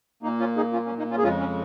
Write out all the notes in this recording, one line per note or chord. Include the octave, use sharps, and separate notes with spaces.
A#2 A#3 D#4
C#4 F4
D#4 G#4
C#4 F4
C#4
A#3 D#4
C#4 F4
G#4
F2 C#3 G#3 C#4 F4
C#4